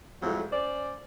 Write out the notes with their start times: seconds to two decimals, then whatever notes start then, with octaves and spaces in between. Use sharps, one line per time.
0.22 F2 A2 F#3 G#3
0.51 C#4 C5 D5